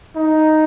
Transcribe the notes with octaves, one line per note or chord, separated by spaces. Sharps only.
D#4